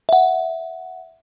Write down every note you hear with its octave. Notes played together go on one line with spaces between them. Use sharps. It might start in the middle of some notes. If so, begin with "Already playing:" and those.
E5 F#5